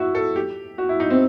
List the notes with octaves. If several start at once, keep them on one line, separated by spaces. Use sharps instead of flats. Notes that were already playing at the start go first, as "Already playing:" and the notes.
Already playing: E4 F#4
A4
G4
F#4
E4
D#4
C4